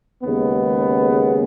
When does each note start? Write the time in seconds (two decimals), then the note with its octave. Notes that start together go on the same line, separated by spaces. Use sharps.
0.22 D#2 C#3 G#3 B3